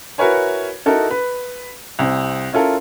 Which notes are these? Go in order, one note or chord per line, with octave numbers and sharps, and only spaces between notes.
E4 F#4 A#4 B4 C#5 G#5
D#4 E4 F#4 A4 A#4
B4
C2 C4
C#4 E4 F4 A4 A#4